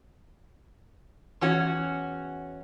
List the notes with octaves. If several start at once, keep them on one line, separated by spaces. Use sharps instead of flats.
E2 C#4 F#4